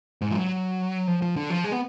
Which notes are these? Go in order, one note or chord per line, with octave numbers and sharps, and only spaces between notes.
G#2
F3
F#3
F3
F3
D3
F3
G#3
B3